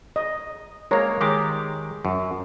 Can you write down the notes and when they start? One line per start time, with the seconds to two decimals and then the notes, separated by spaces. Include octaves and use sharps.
0.16 D#5
0.91 G#3 A#3 A#4 C#5 A#5
1.21 D#3 G#3 G4 D6
2.05 F#2